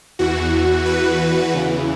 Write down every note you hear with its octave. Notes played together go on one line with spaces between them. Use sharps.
E2 E3 F#4
B4
E2 C#3 E3